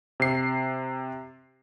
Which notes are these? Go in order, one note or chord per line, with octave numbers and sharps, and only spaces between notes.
C3 C7